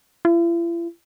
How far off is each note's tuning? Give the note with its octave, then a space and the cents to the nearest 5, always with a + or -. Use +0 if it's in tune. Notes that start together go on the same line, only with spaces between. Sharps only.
E4 +45